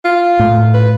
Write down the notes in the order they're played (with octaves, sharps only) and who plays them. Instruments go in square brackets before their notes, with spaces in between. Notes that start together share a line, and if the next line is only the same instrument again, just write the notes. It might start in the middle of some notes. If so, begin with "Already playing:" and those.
[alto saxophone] F4
[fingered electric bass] A2
[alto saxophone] B4